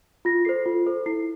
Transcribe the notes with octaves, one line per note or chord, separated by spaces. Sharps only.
F4 A#6
A4 C5 C7
F4
A4 C5
E4 C7